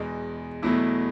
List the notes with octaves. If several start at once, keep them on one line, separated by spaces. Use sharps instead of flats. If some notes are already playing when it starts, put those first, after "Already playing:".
Already playing: E2 B2 G#3
E2 B2 F#3 A3 E4